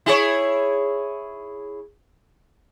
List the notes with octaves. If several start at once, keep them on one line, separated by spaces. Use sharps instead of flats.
E4 G#4 C#5